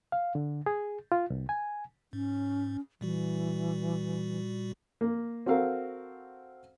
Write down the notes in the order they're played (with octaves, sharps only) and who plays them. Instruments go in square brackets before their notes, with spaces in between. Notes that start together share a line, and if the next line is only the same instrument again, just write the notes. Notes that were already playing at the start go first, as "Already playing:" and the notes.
[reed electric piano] F5
D3
G#4
F4
C2
G#5
[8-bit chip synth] G#2 [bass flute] C#4
[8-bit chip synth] A#2 G3 F#4 [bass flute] E3
[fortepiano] A#3
C4 F#4 A4 A#4 F5